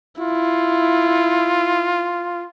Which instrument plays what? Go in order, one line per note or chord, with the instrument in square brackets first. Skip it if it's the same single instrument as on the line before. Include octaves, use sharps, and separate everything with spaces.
[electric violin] E4 [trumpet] F4